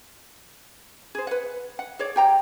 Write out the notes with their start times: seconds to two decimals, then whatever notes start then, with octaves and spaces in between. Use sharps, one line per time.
1.15 G#4 C5
1.27 B4 F#5
1.79 F#5
1.99 G#4 C#5 D5
2.16 G4 G5 A#5